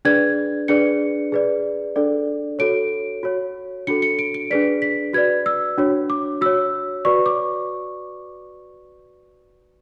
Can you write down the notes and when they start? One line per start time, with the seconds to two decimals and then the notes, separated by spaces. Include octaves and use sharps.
0.05 D4 G#4 B4 D5 G#6
0.68 D4 G#4 B4 D5 C#7
1.32 G#4 B4 D5
1.96 D4 A4 D5
2.59 F#4 A4 C#5 D7
3.23 F#4 C#5
3.87 D4 F#4 A4 C#7
4.02 C#7
4.19 D7
4.34 D7
4.50 D4 G#4 B4 D5 B6
4.82 B6
5.13 F#4 B4 D5 G#6
5.46 E6
5.78 D4 F#4 C#5
6.10 D6
6.41 F#4 C#5 E6
7.05 F#4 B4 D5 C#6
7.26 D6